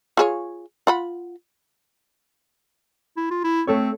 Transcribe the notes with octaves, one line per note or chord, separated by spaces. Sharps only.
F4 G#4 C#5
F4 F#5 B5
E4
F4
E4
A3 C4 A4 C#5